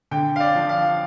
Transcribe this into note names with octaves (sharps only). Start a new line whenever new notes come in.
D3 G5
F5
D5
F3 D4
F5